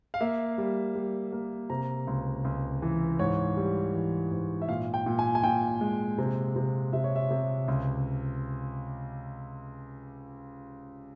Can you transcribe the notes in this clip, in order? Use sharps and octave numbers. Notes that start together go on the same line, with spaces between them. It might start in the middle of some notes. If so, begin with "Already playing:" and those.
F5
A#3 E5
G3
G3
A#3
C3 A#5
C#2
C#2
E3
G#2 C#5
G3
E3
G#2
E5
A#2 F5
G5
A#2
G#5
G#5
A#2 G5
G#3
C3
C3
C3 E5
C#5
E5
C3
C#2